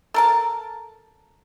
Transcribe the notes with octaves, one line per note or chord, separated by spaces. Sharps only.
A4 A#4 A5